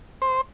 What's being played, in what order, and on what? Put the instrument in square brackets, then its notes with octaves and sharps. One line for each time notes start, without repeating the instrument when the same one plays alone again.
[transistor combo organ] C5